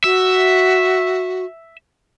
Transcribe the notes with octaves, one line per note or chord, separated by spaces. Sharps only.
F#4 E5